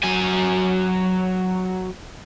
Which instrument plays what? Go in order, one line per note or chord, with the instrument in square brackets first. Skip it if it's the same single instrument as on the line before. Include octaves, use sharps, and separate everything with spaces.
[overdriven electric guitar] F#3 G#5